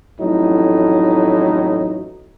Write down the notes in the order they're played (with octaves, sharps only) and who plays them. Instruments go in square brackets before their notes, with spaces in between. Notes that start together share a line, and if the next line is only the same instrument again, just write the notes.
[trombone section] A1 F2 A2 F#3 D#4